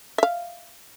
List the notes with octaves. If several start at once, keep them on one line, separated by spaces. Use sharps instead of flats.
E5 F5